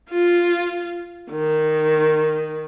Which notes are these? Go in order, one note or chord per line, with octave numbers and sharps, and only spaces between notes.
F4
D#3